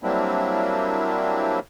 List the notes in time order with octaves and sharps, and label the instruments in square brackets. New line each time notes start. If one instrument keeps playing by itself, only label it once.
[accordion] F#3 G3 A#3 C4 D4 E4